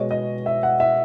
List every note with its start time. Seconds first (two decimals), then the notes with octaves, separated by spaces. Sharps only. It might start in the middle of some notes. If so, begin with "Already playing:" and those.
Already playing: B2 G#3 C#5 D#5
0.11 D#5
0.46 E5
0.63 F#5
0.80 E5